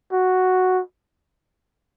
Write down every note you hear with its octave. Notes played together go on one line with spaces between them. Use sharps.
F#4